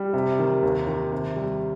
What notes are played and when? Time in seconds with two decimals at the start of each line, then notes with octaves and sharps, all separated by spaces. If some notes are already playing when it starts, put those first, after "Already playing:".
Already playing: G3
0.13 C3
0.39 D#3
0.63 D#2
0.87 D#3
1.12 C3
1.36 G3